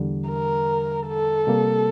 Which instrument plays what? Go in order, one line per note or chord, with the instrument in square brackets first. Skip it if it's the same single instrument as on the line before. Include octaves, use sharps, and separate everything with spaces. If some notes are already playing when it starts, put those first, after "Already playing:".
Already playing: [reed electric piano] E2 D3 G3
[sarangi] A#4
A4
[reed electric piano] C3 G3 A#3